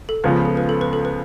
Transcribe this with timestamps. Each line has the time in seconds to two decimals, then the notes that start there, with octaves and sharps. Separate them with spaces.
0.09 A4
0.24 C#2 C#3 F3 B3 B4
0.45 A4
0.57 B4
0.69 A4
0.81 B4
0.93 A4
1.05 B4